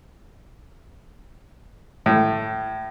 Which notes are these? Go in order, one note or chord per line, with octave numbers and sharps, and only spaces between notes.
A2